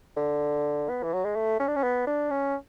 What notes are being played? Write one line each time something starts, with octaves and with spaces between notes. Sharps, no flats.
D3
B3
E3
F#3
G#3
A3
C#4
D4
C#4
B3
D4
C#4